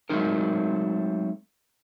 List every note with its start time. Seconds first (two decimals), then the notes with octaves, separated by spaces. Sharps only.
0.09 F#3 G#3 A3 C4 D#4 A#4